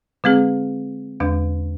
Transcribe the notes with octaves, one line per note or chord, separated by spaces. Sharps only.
D3 G#3 C4 G#4
E2 D3 G#3 D4